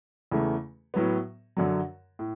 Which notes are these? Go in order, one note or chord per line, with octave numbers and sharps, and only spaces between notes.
E2 C#3 E3 A3
A2 F#3 B3
F#2 D3 F#3
A2